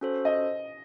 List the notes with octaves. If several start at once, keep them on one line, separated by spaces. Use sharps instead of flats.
C#4 F#4 A4 C5
D#5